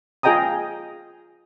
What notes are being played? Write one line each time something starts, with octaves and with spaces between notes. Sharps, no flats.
F4 G#4 D#5 G5 A#5 D#6